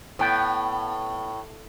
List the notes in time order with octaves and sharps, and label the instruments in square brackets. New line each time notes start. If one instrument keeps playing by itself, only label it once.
[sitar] A2 [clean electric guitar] B3 G5